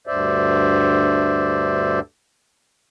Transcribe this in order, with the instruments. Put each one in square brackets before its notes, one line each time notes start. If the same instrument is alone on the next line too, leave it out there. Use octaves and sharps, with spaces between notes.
[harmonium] D2 G2 C5 D5 E5